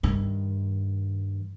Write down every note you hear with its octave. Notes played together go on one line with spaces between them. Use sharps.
G2 D#3